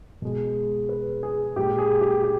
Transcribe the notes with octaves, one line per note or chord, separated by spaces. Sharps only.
B2 G#3
B4
G#4
A#2 G#3 G4
G#4
G4
G4